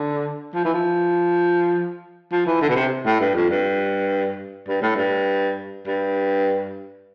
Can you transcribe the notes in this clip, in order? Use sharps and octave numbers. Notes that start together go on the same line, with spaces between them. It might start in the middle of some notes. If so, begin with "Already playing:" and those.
Already playing: D3
F3
E3
F3
F3
E3
D3
B2
C3
A2
G2
F2
G2
G2
A2
G2
G2